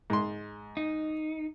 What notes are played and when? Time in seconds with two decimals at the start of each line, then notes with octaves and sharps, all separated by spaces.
0.10 G#2 C6
0.77 D#4